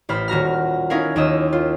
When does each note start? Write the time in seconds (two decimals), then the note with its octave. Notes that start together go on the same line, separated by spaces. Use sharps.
0.09 A1 C5 B5 F6
0.28 D#1 F#4 A#5 F6
0.90 C#4 D#4 E4 A#4 F5
1.16 D#2 F4 D#5 E6
1.53 F4